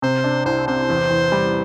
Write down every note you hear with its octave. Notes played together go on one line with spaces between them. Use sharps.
C3 C5
D4
C2 C5
C3 C5
E2
E2
G3